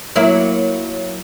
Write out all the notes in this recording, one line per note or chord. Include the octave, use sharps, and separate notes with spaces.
F#3 A#3 E4